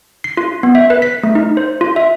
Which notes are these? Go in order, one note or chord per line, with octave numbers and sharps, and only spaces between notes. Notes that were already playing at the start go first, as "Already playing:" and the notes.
C7
F4
B3
E5
B4
B6
A3
D#4
C5
F4
E5